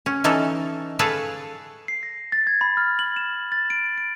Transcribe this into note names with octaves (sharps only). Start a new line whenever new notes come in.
C#4
E3 C#4 D#4 A4
G#4 A4 B4 C#5 F5
C7
A#6
A6
G#6
B5
F6
F#7
E7
A6
D7
D7